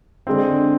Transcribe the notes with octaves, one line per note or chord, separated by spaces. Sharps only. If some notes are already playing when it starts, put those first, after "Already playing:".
D3 G#3 C4